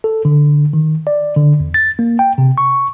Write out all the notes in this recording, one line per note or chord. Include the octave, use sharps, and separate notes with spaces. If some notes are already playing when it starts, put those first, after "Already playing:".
A4
D3
D#3
D5
D3
E2
A6
A#3
G5
C3
C#6